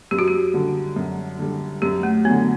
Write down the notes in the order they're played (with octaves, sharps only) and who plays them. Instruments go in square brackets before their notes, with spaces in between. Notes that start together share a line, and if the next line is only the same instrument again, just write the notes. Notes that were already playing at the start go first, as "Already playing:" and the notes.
[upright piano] F#2 [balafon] G4
[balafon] F#4
G4
[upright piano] D3 G3
F#2
D3 G3
[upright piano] F#2 [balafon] G4
[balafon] A3
[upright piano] D3 F#3 [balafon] B3